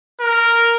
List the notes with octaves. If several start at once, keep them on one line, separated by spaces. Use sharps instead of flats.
A#4